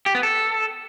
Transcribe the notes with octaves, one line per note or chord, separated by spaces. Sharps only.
G4
B3
A4